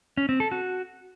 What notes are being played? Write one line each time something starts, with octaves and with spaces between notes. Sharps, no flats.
C#4
C4
A4
F#4